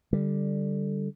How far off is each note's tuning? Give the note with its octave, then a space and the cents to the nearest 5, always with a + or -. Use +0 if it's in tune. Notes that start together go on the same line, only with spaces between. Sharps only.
D3 +0 G3 +0